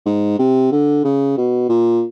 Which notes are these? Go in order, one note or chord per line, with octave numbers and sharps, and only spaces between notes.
G#2
C3
D3
C#3
B2
A#2